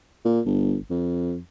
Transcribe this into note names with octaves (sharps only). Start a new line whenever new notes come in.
A#2
G1
F2